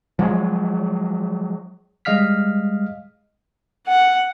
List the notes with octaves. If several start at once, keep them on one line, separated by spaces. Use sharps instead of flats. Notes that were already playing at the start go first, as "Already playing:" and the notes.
F3 F#3 G#3
G3 G#3 D#5 F5 F6 B6
F#5